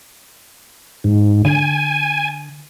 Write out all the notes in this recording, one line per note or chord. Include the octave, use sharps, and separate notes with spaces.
G#2
D3 G#5